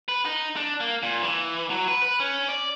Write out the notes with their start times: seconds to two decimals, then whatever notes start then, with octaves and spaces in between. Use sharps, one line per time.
0.08 B4
0.25 D#4
0.56 D4
0.80 A#3
1.03 A#2
1.23 E3
1.70 F#3
1.88 B4
2.03 B4
2.20 C#4
2.49 D5